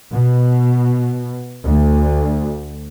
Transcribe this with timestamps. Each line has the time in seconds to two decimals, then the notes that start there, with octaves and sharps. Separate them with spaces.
0.13 B2
1.63 D2